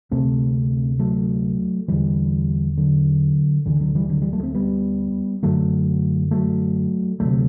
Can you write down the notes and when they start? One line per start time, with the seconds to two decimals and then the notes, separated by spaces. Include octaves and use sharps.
0.11 D2 C3 A3 C4
0.99 F#3 A3
1.88 E2 D3 E3 G3
2.77 D3 F#3
3.66 D2 D3 E3
3.80 D3 F#3
3.95 E3 G3
4.10 D3 F#3
4.21 E3 G3
4.33 F#3 A3
4.43 A3 C4
4.55 G3 B3
5.43 F#2 D3 F#3 A3
6.31 F#3 A3
7.20 D2 C3 F#3 A3